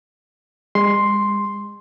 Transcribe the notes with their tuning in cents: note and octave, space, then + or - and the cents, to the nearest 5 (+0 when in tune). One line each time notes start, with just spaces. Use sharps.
G#3 -40 C6 +0